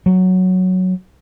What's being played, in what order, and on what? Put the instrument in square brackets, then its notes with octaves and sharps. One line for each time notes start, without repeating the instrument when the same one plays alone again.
[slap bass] F#3